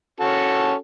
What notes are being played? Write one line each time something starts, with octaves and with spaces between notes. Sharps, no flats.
C#4 F#4 A4